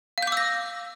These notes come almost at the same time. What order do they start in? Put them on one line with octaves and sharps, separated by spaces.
F5 G6 D6 E6 A#6